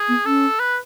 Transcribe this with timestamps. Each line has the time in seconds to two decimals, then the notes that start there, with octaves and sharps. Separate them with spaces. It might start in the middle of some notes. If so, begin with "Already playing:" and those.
Already playing: G#4
0.08 B3
0.25 C#4 A4
0.60 B4